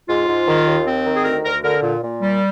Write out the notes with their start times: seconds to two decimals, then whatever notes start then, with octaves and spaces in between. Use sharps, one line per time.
0.08 G#2 F4
0.27 G#2
0.47 D#3
0.66 D#2
0.86 C4
1.05 D#3
1.15 G#4
1.24 D2 A#4
1.44 D2 A#4
1.63 D3 A#4
1.82 A#2
2.02 A#2
2.21 G3